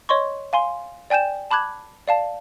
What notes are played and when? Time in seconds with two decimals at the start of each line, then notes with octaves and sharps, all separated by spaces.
0.09 C#5 D#5 C6 C#6
0.53 F5 G#5 C6
1.10 D5 G5 G#5 G6 E7
1.51 A5 B5 D6 F#6 G#6
2.08 D5 F5 A5